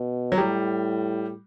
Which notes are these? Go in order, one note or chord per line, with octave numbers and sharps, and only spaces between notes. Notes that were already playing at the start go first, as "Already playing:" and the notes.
Already playing: B2
F#3
A2 G3